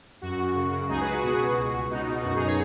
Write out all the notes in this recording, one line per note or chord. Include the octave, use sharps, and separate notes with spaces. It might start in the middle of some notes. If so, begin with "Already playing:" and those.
F#2 F#4
F#2
C#3
C#3
C#2 D#4 G#4
F#4 B4
C#2
F#4
B2 F#4
B2
C#2
C#2
B2 D#4
B2
F#2 F#4
D#4 G#4
G#4 C#5